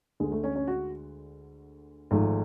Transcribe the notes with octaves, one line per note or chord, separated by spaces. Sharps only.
D2 D3 G#3 G#4
A3
C#4
C#4
F#4
G#1 G#2 F3 G#3 A3